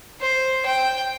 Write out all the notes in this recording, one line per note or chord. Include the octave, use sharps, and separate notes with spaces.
C5
G5